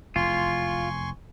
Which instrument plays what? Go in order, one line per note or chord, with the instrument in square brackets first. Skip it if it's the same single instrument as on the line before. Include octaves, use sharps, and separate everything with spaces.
[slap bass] F1 E2 [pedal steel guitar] F4 [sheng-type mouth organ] G#5 C6 C#6